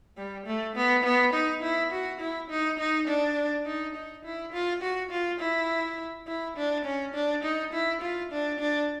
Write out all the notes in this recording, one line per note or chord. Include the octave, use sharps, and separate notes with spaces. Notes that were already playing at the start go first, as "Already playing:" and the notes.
G3
A3
B3
B3
D#4
E4
F#4
E4
D#4
D#4
D4
D#4
D#4
E4
F4
F#4
F4
E4
E4
D4
C#4
D4
D#4
E4
F4
D4
D4